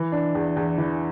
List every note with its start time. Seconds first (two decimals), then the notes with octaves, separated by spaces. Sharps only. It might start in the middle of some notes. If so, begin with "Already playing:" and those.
Already playing: E3
0.12 D4
0.35 E2
0.56 E2
0.78 E3